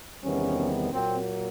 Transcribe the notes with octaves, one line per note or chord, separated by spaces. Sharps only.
E2 C3 D#3 G3 B3 C#4
A#2 F#3 A#3 C4